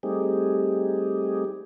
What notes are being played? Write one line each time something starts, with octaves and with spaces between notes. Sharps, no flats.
G3 A3 C4 D#4 G4 G#4